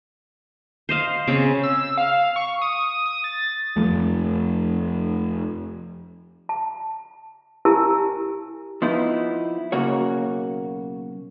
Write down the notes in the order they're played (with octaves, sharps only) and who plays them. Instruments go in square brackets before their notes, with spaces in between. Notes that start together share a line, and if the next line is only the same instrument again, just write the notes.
[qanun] C5 D#5 F5
C#3 C4
[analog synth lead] E6
F5
C#6
D#6
D#6
A6
[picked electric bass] F2 F3 A3
[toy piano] A5
E4 G4 A#4 G#5 A5 E6
[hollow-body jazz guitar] F3 B3 D#4 E4
B1 C#3 A#3 F#4 C#5